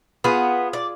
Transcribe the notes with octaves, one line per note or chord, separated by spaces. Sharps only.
B3 F4 G#4
D5